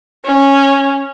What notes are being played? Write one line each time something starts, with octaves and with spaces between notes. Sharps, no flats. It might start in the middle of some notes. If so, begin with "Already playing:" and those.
C#4